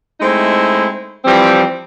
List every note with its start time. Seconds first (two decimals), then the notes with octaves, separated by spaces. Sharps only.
0.20 G#3 A3 C4 D#4 E4
1.25 E3 F3 G3 C4